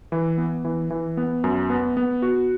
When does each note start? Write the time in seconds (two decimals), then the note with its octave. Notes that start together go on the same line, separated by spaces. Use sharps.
0.12 E3
0.38 B3
0.65 E3
0.90 E3
1.17 B3
1.44 F#2
1.70 B3
1.97 B3
2.22 F#4